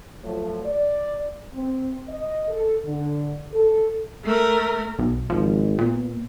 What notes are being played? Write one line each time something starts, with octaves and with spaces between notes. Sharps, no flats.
F3 F#3 A3
D5
C4
D#5
A4
D3
A4
A3 A#4
B1
G#1 F3
A#2 B3